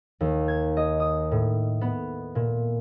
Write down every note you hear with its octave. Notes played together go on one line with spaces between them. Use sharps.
D#2
G#6
D#5
D#6
A2
B3
A#2